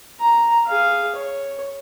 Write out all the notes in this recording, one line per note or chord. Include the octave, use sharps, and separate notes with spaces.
A#5
G#4 F5
C#5